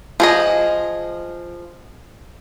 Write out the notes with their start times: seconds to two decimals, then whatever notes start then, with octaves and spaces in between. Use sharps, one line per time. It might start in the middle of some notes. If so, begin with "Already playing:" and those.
0.20 F3 G#4 D#5